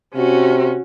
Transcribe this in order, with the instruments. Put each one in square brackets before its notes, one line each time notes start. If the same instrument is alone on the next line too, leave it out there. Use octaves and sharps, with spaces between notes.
[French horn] C3 [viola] C#4 F#4